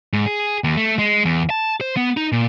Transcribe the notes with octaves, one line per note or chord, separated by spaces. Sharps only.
G#2
G#4
D#2
A3
G#3
E2
A5
C5
B3
D#4
A#2